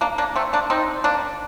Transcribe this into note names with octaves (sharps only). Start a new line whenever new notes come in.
A#3 D4
A#3 D4
A3 C4
A#3 D4
C4 D#4
A#3 D4